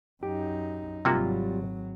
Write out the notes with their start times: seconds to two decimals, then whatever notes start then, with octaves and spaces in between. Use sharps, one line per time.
0.23 F#2 D#4 G4
1.05 G#1 C3 F#3 G3 A#3 F4 F#4